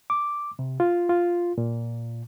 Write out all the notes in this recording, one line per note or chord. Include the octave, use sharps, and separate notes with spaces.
D6
C3
F4
F4
A#2